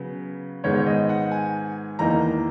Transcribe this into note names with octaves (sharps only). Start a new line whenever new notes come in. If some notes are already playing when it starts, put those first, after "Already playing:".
Already playing: C#3 F#3 B3
G#2 D#3 G#3 B3 C#5
D#5
F#5
G#5
E2 D#3 A#3 D#4 A#5